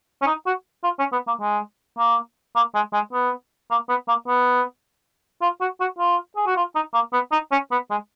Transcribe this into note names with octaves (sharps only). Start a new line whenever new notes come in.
C#4
D#4
F#4
F4
C#4
B3
A#3
G#3
A#3
A#3
G#3
G#3
B3
A#3
B3
A#3
B3
F4
F#4
F#4
F4
G#4
F#4
F4
D#4
A#3
B3
D#4
C#4
B3
G#3